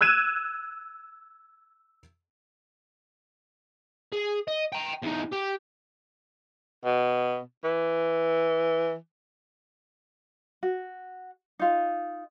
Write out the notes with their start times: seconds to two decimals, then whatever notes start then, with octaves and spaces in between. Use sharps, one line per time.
0.01 E6 F#6 G#6 D#7 E7
4.12 G#4
4.48 D#5
4.73 G5 A#5
5.03 E2 D#4
5.33 G4
6.85 B2
7.64 E3
10.63 F#4
11.59 D#4 F4